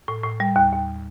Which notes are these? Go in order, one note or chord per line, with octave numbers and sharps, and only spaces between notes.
A2
A2
G3
D#2
D#2